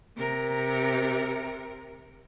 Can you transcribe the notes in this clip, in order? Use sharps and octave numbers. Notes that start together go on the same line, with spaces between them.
C3 A#4